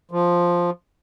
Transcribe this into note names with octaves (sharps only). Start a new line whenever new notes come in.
F3